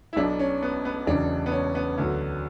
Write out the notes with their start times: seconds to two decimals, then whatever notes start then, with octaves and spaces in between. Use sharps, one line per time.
0.13 E4
0.16 B1 B2 F#3 D4
0.39 C#4
0.63 B3
0.85 B3
1.07 E1 E2 C#3 F#3 D4
1.46 B3
1.52 C#4
1.75 B3
1.98 D2 D3 F#3